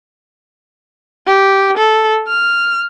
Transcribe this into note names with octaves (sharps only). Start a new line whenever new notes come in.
G4
A4
F6